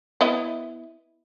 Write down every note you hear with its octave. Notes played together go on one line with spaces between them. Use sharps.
B3 E4 D#5